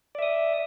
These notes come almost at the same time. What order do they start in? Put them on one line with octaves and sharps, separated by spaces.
D5 E5 D#6